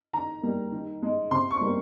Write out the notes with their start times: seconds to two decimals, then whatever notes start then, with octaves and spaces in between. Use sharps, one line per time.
0.13 D#3 A#5
0.42 G3 A#3
0.72 D#3
1.02 G#3
1.31 C3 C6
1.51 C#6
1.61 G3 A#3